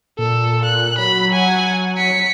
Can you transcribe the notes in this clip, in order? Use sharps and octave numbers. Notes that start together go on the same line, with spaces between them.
A#2 A4
F#6
F#3 B5
F#5 G#5
B6 C#7